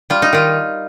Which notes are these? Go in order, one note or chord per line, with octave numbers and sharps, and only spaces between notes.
G3 F4
D#4
D#3 F4